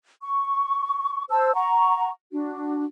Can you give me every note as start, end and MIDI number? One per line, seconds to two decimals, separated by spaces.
0.22 1.23 85
1.30 1.54 72
1.30 1.54 81
1.30 1.54 88
1.54 2.09 78
1.54 2.09 82
1.54 2.09 85
2.32 2.85 62
2.32 2.85 66